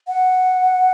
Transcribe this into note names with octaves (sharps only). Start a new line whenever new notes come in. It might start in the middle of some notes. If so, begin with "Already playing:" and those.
F#5